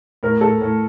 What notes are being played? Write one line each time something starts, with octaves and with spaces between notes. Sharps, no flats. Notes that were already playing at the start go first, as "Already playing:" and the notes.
A2 A#4
A2 A4
A2